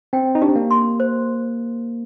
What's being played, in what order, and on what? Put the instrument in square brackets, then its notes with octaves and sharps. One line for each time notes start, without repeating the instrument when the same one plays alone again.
[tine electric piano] C4 [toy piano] G5
[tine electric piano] D#4
[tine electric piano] D4 [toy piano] G4
[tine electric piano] C4
A#3
[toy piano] C6
C5